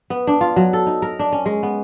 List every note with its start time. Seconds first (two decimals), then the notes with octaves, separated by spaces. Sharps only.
0.10 B3
0.27 D4
0.41 F4
0.56 F#3
0.73 A4
0.87 D#4
1.02 A#4
1.19 D4
1.32 C#4
1.46 G#3
1.63 B3